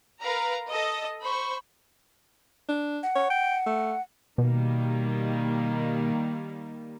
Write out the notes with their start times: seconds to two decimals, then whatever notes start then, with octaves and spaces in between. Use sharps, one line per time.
0.20 A#4 B4 F5 A#5
0.69 A4 D#5 D#6
1.22 C5 B5 C#6
2.69 D4
3.03 F#5
3.16 C#5
3.30 G5
3.66 A3
4.38 B2 D#3 G3 A#3